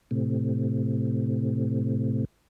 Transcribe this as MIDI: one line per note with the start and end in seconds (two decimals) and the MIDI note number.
0.11 2.25 45
0.11 2.25 48